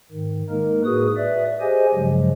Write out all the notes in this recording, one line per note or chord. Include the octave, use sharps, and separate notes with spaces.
G#2 D#3
G#3 A#3 D#4 A#4
A2 F#4 G#4 B4 D#6
B4 D5 E5
G4 G#4 C5 D#5 G#5
G2 C#3 F3 F#3 G#3